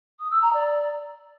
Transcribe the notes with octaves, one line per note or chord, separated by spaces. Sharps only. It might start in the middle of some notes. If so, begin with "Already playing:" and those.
D#6
E6
A#5
D5